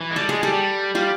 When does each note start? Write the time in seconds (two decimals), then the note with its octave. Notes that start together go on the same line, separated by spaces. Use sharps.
0.01 E3
0.11 G#3
0.16 G3 A4
0.29 G#3 G#4
0.43 G3 G4 A4
0.54 G3
0.95 G3 F4 G4